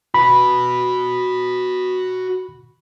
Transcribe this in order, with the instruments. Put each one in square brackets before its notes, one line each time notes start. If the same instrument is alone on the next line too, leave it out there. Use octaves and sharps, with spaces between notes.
[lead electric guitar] F#4 B4 [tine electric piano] B5